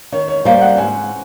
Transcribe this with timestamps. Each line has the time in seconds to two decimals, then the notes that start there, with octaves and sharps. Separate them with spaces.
0.12 D#3 C#5
0.28 C#5
0.45 G3 A#3 C5
0.61 F#5
0.77 G#2 G#5